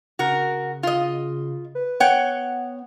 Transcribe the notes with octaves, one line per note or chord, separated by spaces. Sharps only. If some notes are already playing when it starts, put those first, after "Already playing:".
C#3 F#4 A#4
F4 D#5
B4
B3 C#5 F#5 G5